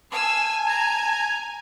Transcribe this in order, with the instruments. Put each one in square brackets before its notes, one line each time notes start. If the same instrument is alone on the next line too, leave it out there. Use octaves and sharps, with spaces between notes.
[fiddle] F5 E6 [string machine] G#5 [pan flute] A5
[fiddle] A#5 [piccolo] G#6